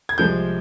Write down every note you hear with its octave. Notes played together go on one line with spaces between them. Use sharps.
G#6
C2 C3 F3 G#3 G6